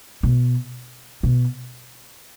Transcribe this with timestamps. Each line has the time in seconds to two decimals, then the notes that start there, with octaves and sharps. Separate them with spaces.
0.23 B2
1.23 B2